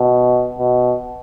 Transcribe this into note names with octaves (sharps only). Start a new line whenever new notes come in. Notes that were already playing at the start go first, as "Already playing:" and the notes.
Already playing: B2
B2